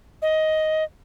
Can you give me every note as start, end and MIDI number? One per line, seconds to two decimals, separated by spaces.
0.22 0.84 75